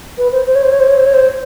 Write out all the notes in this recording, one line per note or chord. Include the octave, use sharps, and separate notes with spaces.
B4
C5
C5
C#5
C5
C#5
C5
C#5
C5
C#5
C5